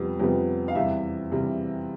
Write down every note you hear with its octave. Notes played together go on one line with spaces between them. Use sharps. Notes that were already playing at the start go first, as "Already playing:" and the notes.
Already playing: F2 C3 G3 B3
F2 C3 G3 B3
F5
E2 C3 G3 E5
E2 C3 G3